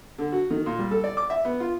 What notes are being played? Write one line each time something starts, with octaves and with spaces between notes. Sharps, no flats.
D3
F#4
D#3
A#2
G3
A4
D5
D6
E5
B3
F4